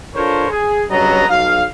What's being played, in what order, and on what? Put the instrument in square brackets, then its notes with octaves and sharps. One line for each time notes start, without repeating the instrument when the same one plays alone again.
[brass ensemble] D4 F4 A4 A#4 C5 C#5
G#4
G2 C#3 F#3 B3 D#5 A#5
B1 F5